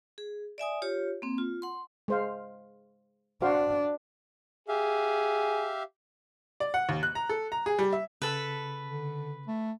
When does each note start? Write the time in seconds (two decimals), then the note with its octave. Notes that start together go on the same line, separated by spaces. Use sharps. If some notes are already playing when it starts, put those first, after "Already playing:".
0.18 G#4
0.58 D5 E5 G#5 D#6
0.82 F4 G4 C#5
1.22 A#3 C4
1.38 F4
1.62 F#5 C6
2.08 G#3 C5 F5
3.42 D4 F#4 C5 F5
4.68 G4 G#4 E5 F5
6.60 D5
6.74 F#5
6.89 D#2
7.03 F#6
7.15 A#5
7.29 A4
7.52 A#5
7.66 G#4
7.79 G3
7.93 E5
8.22 C#3 A4 B4 A6
8.88 D3
9.47 A3